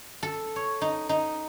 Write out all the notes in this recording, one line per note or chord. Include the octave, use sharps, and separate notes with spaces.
A4
C#5
D#4
D#4